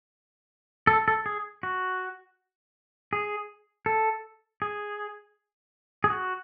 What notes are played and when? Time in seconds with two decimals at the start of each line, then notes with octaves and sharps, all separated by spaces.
0.87 A4
1.08 A4
1.26 G#4
1.63 F#4
3.13 G#4
3.86 A4
4.62 G#4
6.04 G#4
6.10 F#4